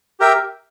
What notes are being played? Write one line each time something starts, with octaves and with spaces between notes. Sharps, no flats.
G4 A#4 E5 G5